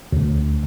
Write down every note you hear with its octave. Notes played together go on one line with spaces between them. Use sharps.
D2